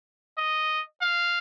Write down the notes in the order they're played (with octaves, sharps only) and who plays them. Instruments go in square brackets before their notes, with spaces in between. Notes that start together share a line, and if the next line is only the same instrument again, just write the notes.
[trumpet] D#5
F5